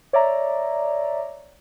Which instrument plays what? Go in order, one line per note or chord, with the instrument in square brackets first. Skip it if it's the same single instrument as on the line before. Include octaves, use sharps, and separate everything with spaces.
[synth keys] C#5 D5 E5 A#5